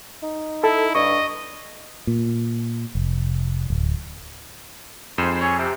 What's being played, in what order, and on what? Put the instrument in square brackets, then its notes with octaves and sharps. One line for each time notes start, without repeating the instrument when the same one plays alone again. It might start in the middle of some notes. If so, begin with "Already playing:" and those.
[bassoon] D#4
[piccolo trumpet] E4 [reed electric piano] A4
[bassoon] G2 [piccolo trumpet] D#5 [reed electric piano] C#6
[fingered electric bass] A#2
F1
D1
[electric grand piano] F2 D#7 E7 [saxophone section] G#2 C5
[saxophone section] G#4 A4 C#5
C3